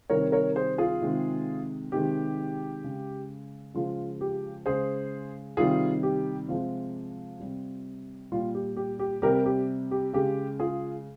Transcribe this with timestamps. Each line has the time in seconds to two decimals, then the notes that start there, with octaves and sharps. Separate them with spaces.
0.10 C3 D#3 G3 A#4 C#5
0.32 A#4 C#5
0.56 G#4 C5
0.78 F4 G#4
1.02 C3 D#3 G#3
1.92 C3 D#3 G#3 G4
2.84 C#3 G#3
3.74 C#3 F3 G#3 F4
4.21 G4
4.66 C#3 G#3 G#4 C5
5.57 C3 D#3 G3 F4 G#4
6.03 G4
6.48 C3 F3 G#3 F4
7.40 C3 G3
8.32 A#2 G3 F4
8.55 G4
8.77 G4
8.99 G4
9.22 C3 G3 G4 A#4
9.46 G4
9.91 G4
10.13 C#3 G#3 G4
10.60 F4 G#4